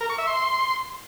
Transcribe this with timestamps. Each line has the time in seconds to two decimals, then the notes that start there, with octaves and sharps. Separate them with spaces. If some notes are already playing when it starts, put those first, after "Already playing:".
0.01 A#4
0.09 C#6
0.18 E5
0.27 C6